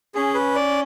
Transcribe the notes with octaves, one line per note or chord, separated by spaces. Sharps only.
C#4 G#4
B4
D5